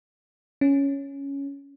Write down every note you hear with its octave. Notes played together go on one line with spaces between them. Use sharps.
C#4